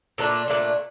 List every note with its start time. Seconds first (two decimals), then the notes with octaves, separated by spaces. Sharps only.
0.18 A#2 A3 D4
0.48 A#2 A3 D4